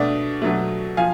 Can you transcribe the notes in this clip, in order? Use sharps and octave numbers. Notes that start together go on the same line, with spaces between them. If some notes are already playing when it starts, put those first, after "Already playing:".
Already playing: B2 A3 D4 D5
B2 F#3 A3
F3 F5 G#5